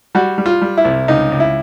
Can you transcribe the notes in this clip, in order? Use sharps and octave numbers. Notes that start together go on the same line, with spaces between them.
G3 F#4
G3
F4
G3
E4
C2
C#2 D#4
C#2
E4